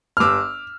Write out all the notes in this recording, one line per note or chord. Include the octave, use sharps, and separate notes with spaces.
F6
G1 D6 E6